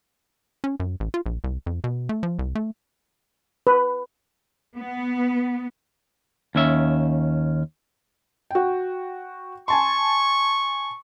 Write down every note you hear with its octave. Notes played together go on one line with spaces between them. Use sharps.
C#4
F#2
A1
F4
A#1
C2
F2
B2
A3
F3
C2
A3
B4
B3
D#2 C#4 E5
F#4 G5
G#5 A5 C6 C#6